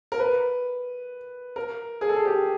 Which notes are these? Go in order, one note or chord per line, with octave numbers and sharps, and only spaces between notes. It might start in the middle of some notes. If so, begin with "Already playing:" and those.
A#4
B4
A#4
G#4
A4
G#4
G4